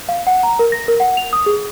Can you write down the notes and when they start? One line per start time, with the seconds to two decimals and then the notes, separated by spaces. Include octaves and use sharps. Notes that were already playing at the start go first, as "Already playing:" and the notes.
0.09 F5
0.27 F#5
0.43 A#5
0.59 A#4
0.72 A#6
0.88 A#4
1.00 F#5
1.17 F7
1.33 D#6
1.46 G#4